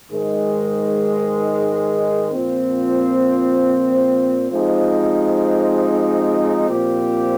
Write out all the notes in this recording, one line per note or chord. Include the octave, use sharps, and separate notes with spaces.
G#2 D#3 G#3
A#2 F3 C4
F3 G#3 C4 D#4 G4
A#2 F3 C4 G4